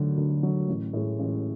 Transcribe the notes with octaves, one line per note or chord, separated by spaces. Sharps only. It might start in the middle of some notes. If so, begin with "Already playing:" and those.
Already playing: D2 D3 F#3
D2
D3 F#3
A1
A2 G#3
A1